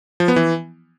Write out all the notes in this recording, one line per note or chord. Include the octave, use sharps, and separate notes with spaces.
F3
B3
E3